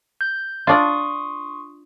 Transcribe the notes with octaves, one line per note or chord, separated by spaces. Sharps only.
G6
D4 F4 C6 C#6 D#6